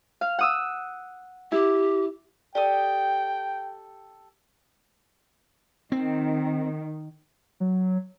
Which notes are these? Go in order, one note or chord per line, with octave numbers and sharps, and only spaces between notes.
F5
F#5 D#6 E6
E4 G4
G4 A4 D5 G5 D#6
D#3 C4
F#3